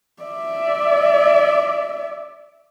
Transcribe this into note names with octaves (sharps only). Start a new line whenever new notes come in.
D5 E5